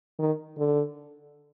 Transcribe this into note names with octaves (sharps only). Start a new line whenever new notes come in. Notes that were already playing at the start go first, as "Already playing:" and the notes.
D#3
D3